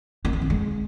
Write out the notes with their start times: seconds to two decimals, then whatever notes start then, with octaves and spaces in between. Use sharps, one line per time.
0.25 A#3
0.33 C4
0.42 D#3
0.50 G#3